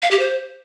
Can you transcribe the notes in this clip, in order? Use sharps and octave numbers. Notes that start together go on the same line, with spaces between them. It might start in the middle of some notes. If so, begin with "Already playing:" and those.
F5
G4
C5